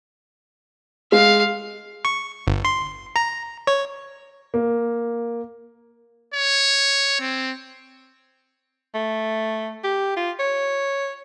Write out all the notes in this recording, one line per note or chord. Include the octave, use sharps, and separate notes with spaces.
G#3 F5
C#6
G1
C6
A#5
C#5
A#3
C#5
C4
A3
G4
F4
C#5